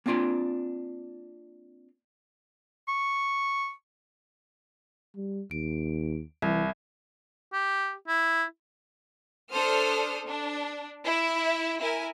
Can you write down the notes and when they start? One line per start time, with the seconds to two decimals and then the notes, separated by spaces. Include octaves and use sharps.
0.06 A#3 C4 D4 F4 C6
2.88 C#6
5.16 G3
5.51 D#2 D7
6.42 C2 E3 E5 G#6
7.53 G4
8.08 E4
9.52 D4 A4 C5 D#6 F6
10.26 D4
11.05 E4 E5
11.80 E4 A#4 G#5